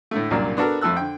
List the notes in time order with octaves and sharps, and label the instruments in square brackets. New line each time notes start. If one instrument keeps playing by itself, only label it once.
[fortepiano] A2 D3 A3
C2 F#2 A#2 A#3 D4 D5
B3 D4 F#4 A4 A#4
F2 A3 A4 E6 F#6
D3 G5